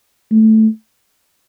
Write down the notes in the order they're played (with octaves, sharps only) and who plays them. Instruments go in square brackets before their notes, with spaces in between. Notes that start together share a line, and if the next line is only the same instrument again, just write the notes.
[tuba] A3